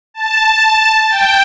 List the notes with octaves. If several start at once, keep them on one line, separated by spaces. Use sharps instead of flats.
A5
G5